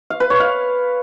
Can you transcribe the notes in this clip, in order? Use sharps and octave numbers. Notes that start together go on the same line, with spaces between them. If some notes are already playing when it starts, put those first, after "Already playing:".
F5
B4
C#5
F5